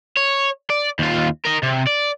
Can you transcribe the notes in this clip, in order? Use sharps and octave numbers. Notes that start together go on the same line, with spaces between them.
C#5
D5
D#2 F4
A#4 D#5
C3
D5